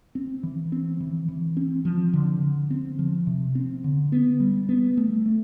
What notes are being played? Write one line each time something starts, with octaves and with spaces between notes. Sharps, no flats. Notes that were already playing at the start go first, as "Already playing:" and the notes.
C4
E3
C4
E3
E3
C4
F3
D3
D3
C4
F3
C3
C4
D3
B3
G3
B3
A3
A3